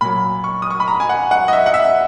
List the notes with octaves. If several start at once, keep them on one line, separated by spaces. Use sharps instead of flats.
A#2 F#3 B5
C#6
D#6
C#6
B5
A#5
G#5
F#5
F#5
D#5
E5
F#5
E5